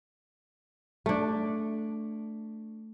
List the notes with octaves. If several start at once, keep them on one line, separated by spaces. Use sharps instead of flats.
A3 D4